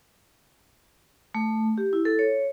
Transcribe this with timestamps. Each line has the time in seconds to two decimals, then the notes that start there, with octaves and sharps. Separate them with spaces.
1.35 A3
1.78 G4
1.93 E4
2.05 A4
2.19 C#5